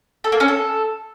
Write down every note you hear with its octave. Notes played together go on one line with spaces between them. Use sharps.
A4
A#3
C#4
A4